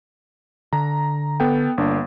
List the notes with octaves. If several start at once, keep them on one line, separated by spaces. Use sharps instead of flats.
D3 A#5
B3 A4 G5
G1 A#3 D4